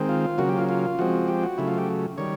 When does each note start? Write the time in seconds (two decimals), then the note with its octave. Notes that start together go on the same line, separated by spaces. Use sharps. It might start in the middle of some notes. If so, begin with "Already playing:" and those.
Already playing: D#3 G#3 C4
0.09 F4
0.38 C#3 F#3 A#3 F#4
0.49 G4
0.58 F4
0.69 F4
0.99 F3 G#3 C4 F#4
1.28 G4
1.43 F#4
1.58 C#3 F#3 A3 E4
1.68 F4
1.78 G4
2.18 D#3 G3 C#5